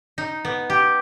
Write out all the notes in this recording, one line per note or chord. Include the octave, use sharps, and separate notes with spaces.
D#4
B3
G4